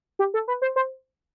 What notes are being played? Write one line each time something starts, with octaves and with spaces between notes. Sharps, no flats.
G4
A4
B4
C5
C5